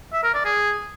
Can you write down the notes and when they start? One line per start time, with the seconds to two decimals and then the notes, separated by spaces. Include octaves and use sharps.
0.13 E5
0.24 A#4
0.34 D5
0.45 G#4